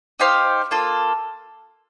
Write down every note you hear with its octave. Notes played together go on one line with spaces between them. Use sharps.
D#4 G4 C5 F5
A#3 F4 A4